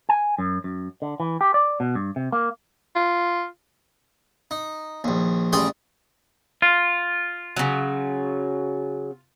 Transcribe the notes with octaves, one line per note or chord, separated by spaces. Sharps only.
G#5
F#2
F#2
D3
E3
G4
D5
B2
G2
C3
A#3
F4
D#4
A#1 D#2
A1 G3 G#4 G5 C6
F4
C#3 F#3